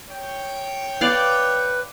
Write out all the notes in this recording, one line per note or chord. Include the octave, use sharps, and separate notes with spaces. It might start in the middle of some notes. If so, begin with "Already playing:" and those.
C#5 G5
B4 D5 F5